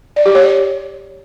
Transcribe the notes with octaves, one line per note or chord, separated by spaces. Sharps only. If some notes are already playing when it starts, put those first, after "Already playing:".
D5
G4
C#5